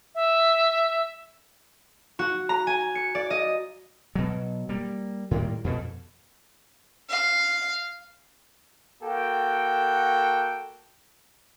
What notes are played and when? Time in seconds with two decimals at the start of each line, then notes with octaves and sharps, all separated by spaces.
0.15 E5
2.19 F#4
2.49 A#5
2.67 G#5
2.95 C#7
3.15 D5
3.30 D#5
4.15 B2 F#3
4.69 G3 A#3
5.31 A2 D#3 G3 A#3
5.64 F2 B2
7.10 F5
9.03 A#3 F#4 A4 G5